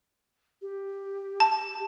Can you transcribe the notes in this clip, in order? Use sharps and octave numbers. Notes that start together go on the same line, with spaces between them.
G4
A5